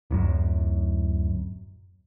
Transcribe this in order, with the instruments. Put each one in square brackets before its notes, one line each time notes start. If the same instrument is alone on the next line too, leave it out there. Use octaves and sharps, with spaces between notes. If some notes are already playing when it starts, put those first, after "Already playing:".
[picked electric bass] D1 F#2